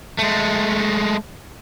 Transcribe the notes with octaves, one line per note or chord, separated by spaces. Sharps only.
G#3 A3